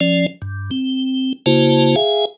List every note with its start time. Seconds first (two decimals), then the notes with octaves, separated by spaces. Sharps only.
0.01 F3 C#4 D5
0.42 G2
0.71 C4
1.46 C#3 A#3 E4 F#4 C5 A5
1.96 G#4 E5 F5 G#5